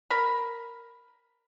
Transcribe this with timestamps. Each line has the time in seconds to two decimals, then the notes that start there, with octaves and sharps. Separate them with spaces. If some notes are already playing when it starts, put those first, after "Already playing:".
0.10 A#4 B5